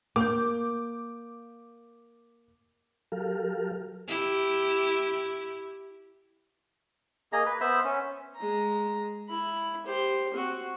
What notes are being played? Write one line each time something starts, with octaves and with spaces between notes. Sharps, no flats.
A#3 D6 G6
F#3 G4 A4 A#4 F5
E4 G4
A#3 G#4 D#5 A#5
B4
B3 C5 E5 B5
C#4
G#3 A#5
E4 B5
G4 C5
C4 F#4